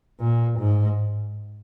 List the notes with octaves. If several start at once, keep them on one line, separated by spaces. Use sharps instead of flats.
A#2
G#2